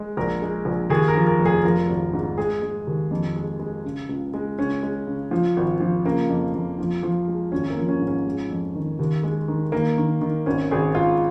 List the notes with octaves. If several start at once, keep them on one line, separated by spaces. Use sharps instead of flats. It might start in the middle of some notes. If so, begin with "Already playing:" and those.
Already playing: G#3
A#1 A#4
G#3
A#1
D#2 G#4
A#4
F3
A#4
F1
G#4
F3 A#4
G#1
G#2
G#3 G#4
G#3
D#2
F2
G#3
G#3
C#3
C#2
G#3
C#2 C#4
G#3
C#3
F3
G#1
F3
C#3 A#3
F2
F2
F3
F3
G#3
G#1 C#4
A#3
F3
C#4
G#2
C#4
G#3
F2
D#3
D#2
G#3
D#3
D#3 A#3
D#3
D#3
G#1 C#4
G#1 G#4
G#2 F4